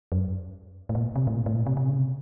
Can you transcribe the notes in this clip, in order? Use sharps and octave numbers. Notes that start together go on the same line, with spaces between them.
F#2
A2
A#2
C3
A2
A#2
A2
A#2
C3
C3
C#3
C3